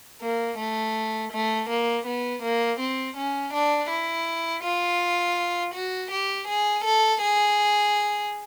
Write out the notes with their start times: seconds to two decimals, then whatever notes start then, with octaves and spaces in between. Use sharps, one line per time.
0.22 A#3
0.58 A3
1.32 A3
1.69 A#3
2.06 B3
2.42 A#3
2.80 C4
3.17 C#4
3.53 D4
3.90 E4
4.63 F4
5.74 F#4
6.11 G4
6.48 G#4
6.84 A4
7.21 G#4